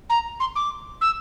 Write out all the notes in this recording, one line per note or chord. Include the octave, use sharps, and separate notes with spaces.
A#5
C6
D6
E6